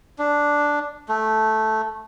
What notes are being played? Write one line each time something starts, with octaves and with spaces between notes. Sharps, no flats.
D4
A3